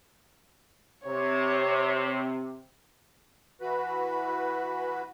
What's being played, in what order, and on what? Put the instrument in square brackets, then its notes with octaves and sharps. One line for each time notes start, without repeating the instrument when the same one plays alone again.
[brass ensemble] C3 [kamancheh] C#5
[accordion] E3 F#4 B4